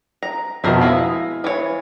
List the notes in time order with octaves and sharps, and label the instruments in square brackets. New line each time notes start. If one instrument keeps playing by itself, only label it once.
[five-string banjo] A#5
[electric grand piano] F2 B2 [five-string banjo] A#4 C5 E5
[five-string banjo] G#3 E4 D#5 [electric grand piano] F5
[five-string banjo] E3 C#5